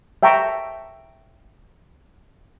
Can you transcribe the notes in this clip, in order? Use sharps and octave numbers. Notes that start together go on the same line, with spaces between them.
E5 G5 A5 A#5 C#6